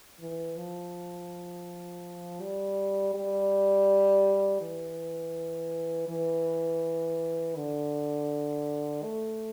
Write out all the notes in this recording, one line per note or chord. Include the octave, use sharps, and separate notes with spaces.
E3
F3
G3
G3
E3
E3
D3
A3